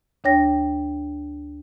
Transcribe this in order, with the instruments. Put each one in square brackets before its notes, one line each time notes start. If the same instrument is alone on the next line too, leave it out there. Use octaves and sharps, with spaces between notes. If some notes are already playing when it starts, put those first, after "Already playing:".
[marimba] D2 D4 C#5 G5 A#6